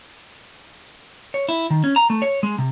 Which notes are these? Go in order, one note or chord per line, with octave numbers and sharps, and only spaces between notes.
C#5
E4
D#3
C#4
A#5
A3
C#5
G#3
C3